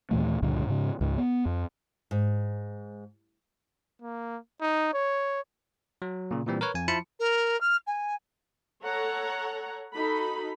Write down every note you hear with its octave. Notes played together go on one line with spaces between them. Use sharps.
D#2 A#2 E3 A3
C#2 G2 A#2 D3
G#2 C#3
C#2 G#2
B3
F2
G#2
A#3
D#4
C#5
F#3
A#2 C#3
A#2 E3 G3 C4
A#4 B4 C#5
F2 G#5
F3 E4 A5 B5 C6 C#7
A#4
F6
G#5
A4 C#5 F#5 A#5
D#4 F#4 A4 B5